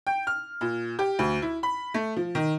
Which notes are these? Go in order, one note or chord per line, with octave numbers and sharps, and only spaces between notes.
G5
F6
A#2
G4
D2
E4
B5
A3
F3
D#3